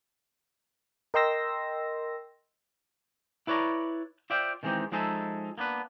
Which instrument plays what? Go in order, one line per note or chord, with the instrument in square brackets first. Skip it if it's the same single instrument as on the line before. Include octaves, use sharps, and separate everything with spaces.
[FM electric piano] A#4 D#5 G5 C6 E6 A#6
[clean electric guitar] E4 B4 C#5 D5 A#5
F4 C5 D5 E5 F5 G5
D#3 E3 G#3 C4 D#4 G4
F3 G#3 D#4 G#4 A4 E5
A#3 B3 D4 B4